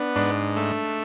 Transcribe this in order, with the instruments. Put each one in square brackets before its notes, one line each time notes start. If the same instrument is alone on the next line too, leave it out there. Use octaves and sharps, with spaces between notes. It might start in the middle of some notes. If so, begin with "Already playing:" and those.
Already playing: [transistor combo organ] B3 [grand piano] D4
[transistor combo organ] G#2 [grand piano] D4
[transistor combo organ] A3